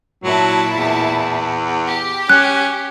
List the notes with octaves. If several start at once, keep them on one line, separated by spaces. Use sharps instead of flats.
A#2 F#3 E4 A5
E2
G4
C#4 F#6